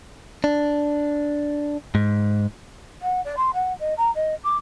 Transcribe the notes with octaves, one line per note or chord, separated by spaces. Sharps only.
D4
G#2
F#5
D5
C6
F#5
D#5
A#5
D#5
D6